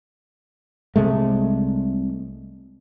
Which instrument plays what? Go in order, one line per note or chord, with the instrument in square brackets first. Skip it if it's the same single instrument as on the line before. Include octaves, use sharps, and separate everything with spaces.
[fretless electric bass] C2 C3 G#3 A3